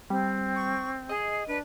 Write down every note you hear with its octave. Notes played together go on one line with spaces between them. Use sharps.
G3 C4
C#6
G#4 D#5
D4 B4